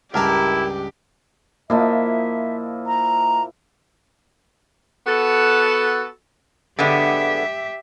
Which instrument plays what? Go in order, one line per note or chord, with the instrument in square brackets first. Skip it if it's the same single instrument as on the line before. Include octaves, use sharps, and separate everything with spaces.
[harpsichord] C#2 G2 D4 [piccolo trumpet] E4 [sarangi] G4 [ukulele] A#4 A5 A#5
[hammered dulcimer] A#2 F3 E4 [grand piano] A#3 D#5 A5 [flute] E5
[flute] A#5
[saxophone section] B3 F#4 A4
[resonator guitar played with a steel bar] D3 G#3 B3 [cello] G4 E5